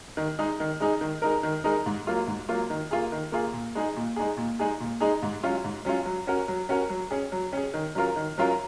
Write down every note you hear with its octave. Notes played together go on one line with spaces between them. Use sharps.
D#3
G#3 D#4 G#4
D#3
G#3 D#4 G#4
D#3
G#3 D#4 A#4
D#3
G#3 D#4 A#4
G#2
F#3 A#3 F4
G#2
F#3 A#3 F4
D#3
A#3 F4 G#4
D#3
A#3 F4 G#4
A#2
G#3 D#4 G#4
A#2
G#3 D#4 G#4
A#2
G#3 D#4 G#4
A#2
G#3 D#4 G#4
G#2
F#3 C#4 F4
G#2
F#3 C#4 F4
F#3
C#4 F#4 A#4
F#3
C#4 F#4 A#4
F#3
C#4 G#4
F#3
C#4 G#4
D#3
F#3 C#4 F4 A#4
D#3
F#3 C#4 F4 A#4